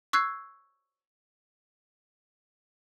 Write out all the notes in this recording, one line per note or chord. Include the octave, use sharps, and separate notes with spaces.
C#6 E6 F#6 G#6 C7